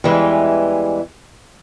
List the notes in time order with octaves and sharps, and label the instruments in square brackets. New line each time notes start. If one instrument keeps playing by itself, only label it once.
[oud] E2 E3 [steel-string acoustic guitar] G3 G#3